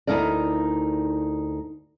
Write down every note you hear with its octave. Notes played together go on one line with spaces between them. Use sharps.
D2 A#2 D#4 E4 A#4 D5